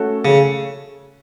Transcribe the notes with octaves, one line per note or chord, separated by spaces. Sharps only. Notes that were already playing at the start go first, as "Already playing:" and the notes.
Already playing: A3 C#4 F#4 A4
C#3